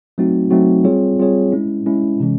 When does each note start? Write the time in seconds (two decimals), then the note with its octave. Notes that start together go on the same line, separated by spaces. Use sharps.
0.18 F#3 A3 C4 D#4 F#4
0.51 F#3 A3 C4 D#4 F#4
0.84 G3 C4 F4 G#4 C#5
1.19 G3 C4 F4 G#4 C#5
1.52 G#3 C#4 E4
1.86 G#3 C#4 E4
2.20 C3 E3 G#3 C#4